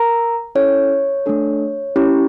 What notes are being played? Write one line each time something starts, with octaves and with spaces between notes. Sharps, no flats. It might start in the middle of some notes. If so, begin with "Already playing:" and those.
Already playing: A#4 A#5
C#4 E4 A4 C#5
A3 D4 A4
C#4 E4 G4